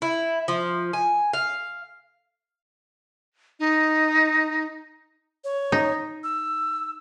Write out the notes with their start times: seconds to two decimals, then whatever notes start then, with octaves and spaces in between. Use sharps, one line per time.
0.02 E4
0.48 F3
0.93 G#5
1.33 F5
3.60 D#4
5.44 C#5
5.72 D#4
6.24 E6